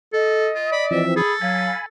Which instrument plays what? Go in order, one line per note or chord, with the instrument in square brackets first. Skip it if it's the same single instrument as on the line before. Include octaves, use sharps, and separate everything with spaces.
[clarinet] A4 [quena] D#5
[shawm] F4
[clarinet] D5 [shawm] B5
[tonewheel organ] E3 F3 C4 [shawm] E5
[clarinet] G#4 [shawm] A4 [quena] B5
[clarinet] F#3 [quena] F5 [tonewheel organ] G#5 B5